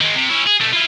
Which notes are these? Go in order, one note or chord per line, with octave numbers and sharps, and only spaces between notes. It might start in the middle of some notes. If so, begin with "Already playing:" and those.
D#3 G#3
C3
C#4 E4
G#4
B2 A3
E4 F4